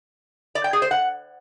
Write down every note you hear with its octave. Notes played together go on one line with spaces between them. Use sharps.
D5
G5
G#4
C5
F#5